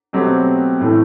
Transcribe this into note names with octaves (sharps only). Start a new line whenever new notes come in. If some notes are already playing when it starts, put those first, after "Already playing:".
B2 F#3 A3 C4 G4
A2 E3 A3